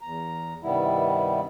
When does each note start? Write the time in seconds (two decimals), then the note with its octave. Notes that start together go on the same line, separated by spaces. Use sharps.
0.01 E2 A#5
0.63 G2 C3 D#3 G3 B3 E4